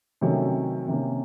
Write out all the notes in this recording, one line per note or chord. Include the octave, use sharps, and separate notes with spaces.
C3 D#3 F#3 A3 C#4
C3 D#3 A#3 C#4